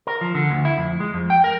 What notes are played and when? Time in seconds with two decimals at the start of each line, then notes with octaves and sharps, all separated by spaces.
0.07 A#4
0.21 F3
0.35 D3
0.51 D2
0.65 E4
0.77 F2
1.00 G#3
1.14 F2
1.30 G5
1.44 A#4